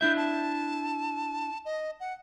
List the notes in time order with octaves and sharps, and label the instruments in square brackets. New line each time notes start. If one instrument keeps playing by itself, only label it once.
[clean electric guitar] D4 E4 E5 [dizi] G6
[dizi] A5
D#5
F#5